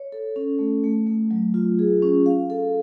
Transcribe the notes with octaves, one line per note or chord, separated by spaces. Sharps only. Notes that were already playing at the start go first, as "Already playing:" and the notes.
Already playing: C#5
A4
C#4
A3
A3
A3
F#3
F4
G#4
C#4
F5
A4